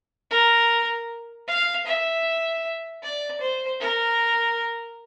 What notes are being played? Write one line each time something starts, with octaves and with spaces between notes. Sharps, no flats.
A#4
F5
E5
D5
C5
A#4